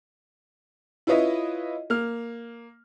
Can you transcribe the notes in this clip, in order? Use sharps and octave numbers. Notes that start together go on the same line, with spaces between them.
E4 F4 B4 C#5 D#5 E5
A#3 F6